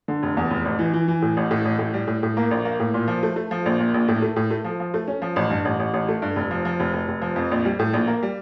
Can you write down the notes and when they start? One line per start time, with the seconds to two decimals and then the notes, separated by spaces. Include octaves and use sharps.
0.08 D3
0.23 F1
0.37 E2
0.51 F1
0.65 A1
0.79 E3
0.93 E3
1.08 E3
1.22 A2
1.37 A1
1.51 A2
1.65 A1
1.79 A2
1.94 G3
2.07 A2
2.23 A2
2.37 A#3
2.51 A#1
2.65 A#3
2.80 A2
2.94 A#2
3.08 F3
3.23 A3
3.36 A3
3.51 F3
3.66 A#1
3.79 A#2
3.94 A#1
4.08 A2
4.22 A3
4.36 A2
4.51 A3
4.64 F3
4.80 F3
4.94 A3
5.08 C#4
5.22 F3
5.36 A1
5.50 G2
5.65 A1
5.80 A1
5.94 A1
6.08 A3
6.22 G2
6.36 F1
6.51 F3
6.65 F3
6.80 F1
6.94 F1
7.08 F1
7.22 F3
7.36 F2
7.51 A#1
7.65 G3
7.79 A2
7.93 A#1
8.07 A#3
8.23 G3